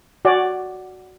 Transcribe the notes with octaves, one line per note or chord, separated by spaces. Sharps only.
F#4 C#5 D5